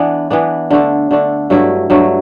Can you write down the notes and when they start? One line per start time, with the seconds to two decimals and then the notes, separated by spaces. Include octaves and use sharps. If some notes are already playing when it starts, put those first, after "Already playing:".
Already playing: E3 B3 D4
0.30 E3 B3 D4
0.71 D3 A3 D4
1.11 D3 A3 D4
1.50 G2 F#3 A3 E4
1.90 G2 F#3 A3 E4